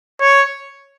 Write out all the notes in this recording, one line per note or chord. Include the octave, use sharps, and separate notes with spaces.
C#5